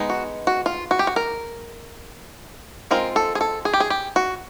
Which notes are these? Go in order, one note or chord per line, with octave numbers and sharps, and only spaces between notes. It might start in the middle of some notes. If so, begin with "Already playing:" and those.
Already playing: G#3 B3 D#4
F#4
F#4
F4
F#4
G4
F#4
A#4
G#3 C4 F4 A#4
A4
G#4
A4
G#4
G4
G#4
G4
F#4